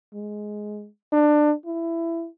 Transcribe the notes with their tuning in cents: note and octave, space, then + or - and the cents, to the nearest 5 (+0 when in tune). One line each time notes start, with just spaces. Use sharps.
G#3 +10
D4 +20
E4 +15